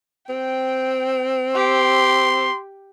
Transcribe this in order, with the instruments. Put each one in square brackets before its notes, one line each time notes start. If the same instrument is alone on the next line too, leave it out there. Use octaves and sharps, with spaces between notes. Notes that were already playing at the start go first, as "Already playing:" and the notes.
[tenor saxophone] C4 [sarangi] G5
[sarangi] G4 [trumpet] C6